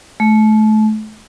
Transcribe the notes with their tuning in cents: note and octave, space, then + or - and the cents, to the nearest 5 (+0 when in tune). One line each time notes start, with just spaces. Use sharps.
A3 -30